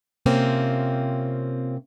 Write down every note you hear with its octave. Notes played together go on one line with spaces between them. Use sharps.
C3 A#3 C4 C#4 F4